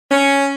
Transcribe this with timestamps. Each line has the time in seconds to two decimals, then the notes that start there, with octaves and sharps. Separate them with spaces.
0.11 C#4